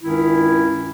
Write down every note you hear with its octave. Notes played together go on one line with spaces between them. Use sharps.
C#2 G2 D#3 C#4 E4